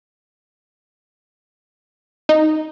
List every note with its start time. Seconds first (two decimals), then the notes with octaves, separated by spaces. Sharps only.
2.29 D#4